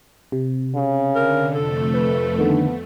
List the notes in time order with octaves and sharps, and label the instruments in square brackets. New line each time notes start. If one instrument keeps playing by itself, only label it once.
[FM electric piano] C3
[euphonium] C#3
[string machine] D3 [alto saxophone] A#4
[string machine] F2 A3 [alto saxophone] A4
[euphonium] B4
[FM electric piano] D3 D#3 [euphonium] B3